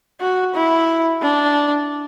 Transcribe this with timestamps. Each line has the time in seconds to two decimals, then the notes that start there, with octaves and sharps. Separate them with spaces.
0.20 F#4
0.55 E4
1.23 D4